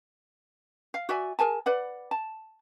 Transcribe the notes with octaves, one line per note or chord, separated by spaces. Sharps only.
F5
F#4 D5 E5 G#5
G#4 A#4 G#5 A5
B4 D5 F#5
A5